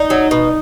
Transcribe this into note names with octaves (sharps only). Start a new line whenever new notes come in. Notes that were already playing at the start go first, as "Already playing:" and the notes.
Already playing: D#4
F#3
B2